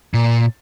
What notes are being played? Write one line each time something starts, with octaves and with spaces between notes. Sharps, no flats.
A#2